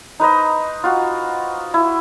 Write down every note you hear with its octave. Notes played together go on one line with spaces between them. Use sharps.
D#4 B4 C5 D#5
F4 F#4
E4